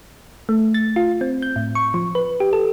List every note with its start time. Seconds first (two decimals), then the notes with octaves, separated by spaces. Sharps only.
0.49 A3
0.74 A6
0.96 F4
1.21 C4
1.42 G6
1.56 A2
1.75 C#6
1.94 F3
2.15 B4
2.40 G4
2.53 A4